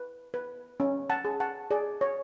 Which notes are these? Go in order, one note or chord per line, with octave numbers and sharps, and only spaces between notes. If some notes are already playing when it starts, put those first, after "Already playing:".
Already playing: B4
B4
C#4
F#5 A5
G#4
F#5 A5
G#4 D5
C#5